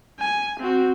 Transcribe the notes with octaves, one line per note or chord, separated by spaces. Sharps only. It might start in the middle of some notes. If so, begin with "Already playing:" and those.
G#5
C4 F#4